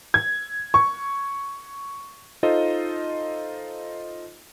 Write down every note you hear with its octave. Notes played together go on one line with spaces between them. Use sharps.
G#6
C#6
D#4 F4 A4 C5 D#5